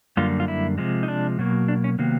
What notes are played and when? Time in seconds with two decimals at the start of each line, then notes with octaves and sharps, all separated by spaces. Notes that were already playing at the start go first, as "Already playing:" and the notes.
0.17 F#2 D3 G3 A#3 F4
0.40 F4
0.48 E4
0.78 C3 F3 G#3
1.03 D#4
1.08 D4
1.39 B2 F#3 A#3
1.68 D4
1.84 C#4
1.99 C3 D#3 F#3 A#3 B3